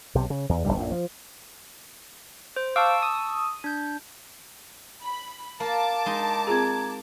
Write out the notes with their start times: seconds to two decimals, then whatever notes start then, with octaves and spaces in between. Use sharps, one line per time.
0.15 B1 C3
0.30 C#3
0.49 E2
0.65 F1 C#2 G2 G3
0.77 A#1 F#2 A2
0.92 F3
2.56 C5
2.76 F5 A5 C#6 D6 E6
3.02 D#6
3.64 D4 G6
5.02 B5
5.60 A#3 A5 D6
6.06 G#3 D#4
6.47 C4 F4 G#4 A#5 G#6